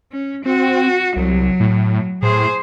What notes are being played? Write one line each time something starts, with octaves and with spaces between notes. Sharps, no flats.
C#4
C4 F#4
C2 F#3
A2
A2 G#4 C5